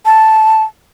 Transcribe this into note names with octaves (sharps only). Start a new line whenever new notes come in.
A5